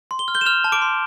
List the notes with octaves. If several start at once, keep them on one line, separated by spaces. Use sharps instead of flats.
C6
G7
F6
G6 G7
E7
F6 F7
A5
D6 D7
C6